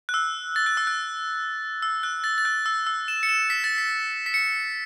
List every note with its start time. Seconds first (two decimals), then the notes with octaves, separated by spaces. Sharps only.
0.09 F#6
0.14 E6
0.56 A6
0.66 F#6
0.77 E6
0.87 F#6
1.82 E6
2.03 F#6
2.24 A6
2.38 A6
2.45 F#6
2.66 E6
2.87 E6
3.08 E7
3.23 C#7
3.29 E7
3.50 B6
3.64 A6
3.78 B6
4.26 B6
4.34 C#7